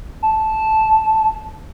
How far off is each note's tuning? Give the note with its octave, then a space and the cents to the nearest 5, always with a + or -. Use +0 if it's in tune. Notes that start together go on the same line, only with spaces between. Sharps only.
A5 -10